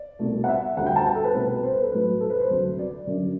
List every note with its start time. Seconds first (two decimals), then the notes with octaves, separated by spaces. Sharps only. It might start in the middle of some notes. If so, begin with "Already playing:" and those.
Already playing: D5
0.19 C2 B2 A3
0.44 F#5
0.48 E5
0.77 D2 D3 G3 F#5
0.86 G5
0.96 A5
1.05 G5
1.15 A4
1.24 B4
1.34 C2 B2 A3 B4
1.63 C5
1.72 B4
1.82 A4
1.92 A2 F#3 A3 B4
2.21 A4
2.30 B4
2.40 C5
2.50 D2 C3 F#3
2.79 D5
3.07 F#2 D3 F#3